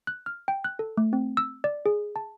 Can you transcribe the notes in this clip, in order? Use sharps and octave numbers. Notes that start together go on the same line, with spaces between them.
F#6
F6
G5
F#6
A4
A3
C4
E6
D5
G#4
A5